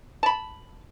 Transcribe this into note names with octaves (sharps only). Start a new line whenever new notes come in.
A5 B5